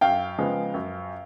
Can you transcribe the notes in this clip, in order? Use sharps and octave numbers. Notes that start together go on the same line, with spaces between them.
F#2 F5 G5
C#3 F3 G#3 B3
F#2